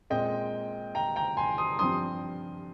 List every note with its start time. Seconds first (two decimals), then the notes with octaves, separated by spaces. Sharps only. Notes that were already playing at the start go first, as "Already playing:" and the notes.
0.10 A#2 G#3 C4 D#5 G5
0.95 G5 A#5
1.16 G5 A#5
1.37 G#5 C6
1.58 C6 D#6
1.79 G2 F3 C4 C6 D#6